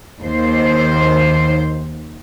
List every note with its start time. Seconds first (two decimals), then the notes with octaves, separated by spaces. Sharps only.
0.21 D#2 C5